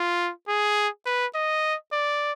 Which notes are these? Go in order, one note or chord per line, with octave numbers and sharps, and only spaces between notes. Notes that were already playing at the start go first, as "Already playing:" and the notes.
Already playing: F4
G#4
B4
D#5
D5